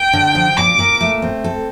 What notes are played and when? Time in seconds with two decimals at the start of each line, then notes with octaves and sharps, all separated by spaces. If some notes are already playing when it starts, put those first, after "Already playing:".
Already playing: G5
0.13 D3
0.35 F3
0.57 A#2 D6
0.79 A#2
1.01 A3
1.22 C4
1.44 A4